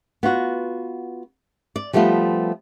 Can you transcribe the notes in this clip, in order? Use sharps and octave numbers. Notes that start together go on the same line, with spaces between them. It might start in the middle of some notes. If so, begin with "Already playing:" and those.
B3 F4 F#4
D5
F3 G3 A3 B3 F4